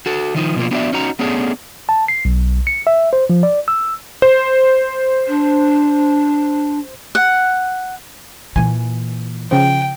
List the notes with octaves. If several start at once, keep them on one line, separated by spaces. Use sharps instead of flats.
F#4 A4
D#3 F3 D#4
B2 F3 A#3 F4
B3 D4 F#4 A4 D5 E5
C#4 D#4 F#4 A#5
A3 B3 C#4 D4 G#4
A5
C7
B1
C#7
E5
C5
F3
D5
E6
C5
D4
F#5
A#2 E3 G#5
C#3 F3 G5